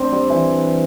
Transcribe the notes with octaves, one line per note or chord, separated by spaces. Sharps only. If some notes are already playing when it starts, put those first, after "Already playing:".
Already playing: C4 D4
G3
E3